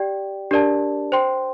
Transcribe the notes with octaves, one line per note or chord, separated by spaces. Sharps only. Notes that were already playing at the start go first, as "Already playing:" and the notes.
Already playing: G4 D5 G5
D4 G4 A#4 D5 A5
C5 G5 C6